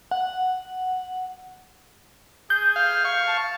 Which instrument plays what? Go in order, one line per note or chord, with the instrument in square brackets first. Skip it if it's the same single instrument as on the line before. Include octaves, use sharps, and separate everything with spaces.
[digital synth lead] F#5
[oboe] G#4 [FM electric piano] G6
[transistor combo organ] F5
F5 C#6
[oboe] A5